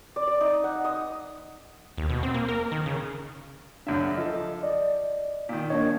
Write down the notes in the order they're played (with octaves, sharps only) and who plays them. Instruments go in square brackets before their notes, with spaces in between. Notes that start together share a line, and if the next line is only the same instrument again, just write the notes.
[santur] D5
D5
D#4
F#5
D#6
[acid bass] D#2
B2
C4
A#3
A#4
D#3
C#3
[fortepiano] C#2 F#2 E5 [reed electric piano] D4
[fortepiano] F3 A4 [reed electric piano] D#5
[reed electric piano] D5 D#5
[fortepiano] A#2 D#3
[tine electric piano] A#3 D4 C#5 [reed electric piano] D#5